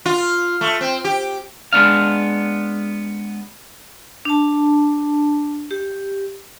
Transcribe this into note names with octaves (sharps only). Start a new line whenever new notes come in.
F4
A3
C4
G4
G#3 B3 D4 F5
D4 A5
G4